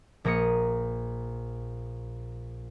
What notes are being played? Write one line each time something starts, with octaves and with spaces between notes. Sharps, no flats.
A#1 A#3 A#5 D#6 C#7